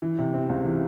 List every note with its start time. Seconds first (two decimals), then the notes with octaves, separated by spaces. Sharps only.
0.02 E3
0.19 C3
0.34 C4
0.49 C#2
0.65 E3